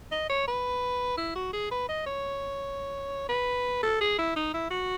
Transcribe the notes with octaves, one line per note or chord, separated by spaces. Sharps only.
D#5
C#5
B4
E4
F#4
G#4
B4
D#5
C#5
B4
A4
G#4
E4
D#4
E4
F#4